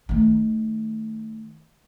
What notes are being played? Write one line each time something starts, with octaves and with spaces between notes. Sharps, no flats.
D#3 A3